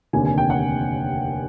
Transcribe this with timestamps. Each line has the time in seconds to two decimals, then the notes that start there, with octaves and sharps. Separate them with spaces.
0.13 F1 D#2 D3 G#5
0.25 G#5
0.38 G5
0.50 F#5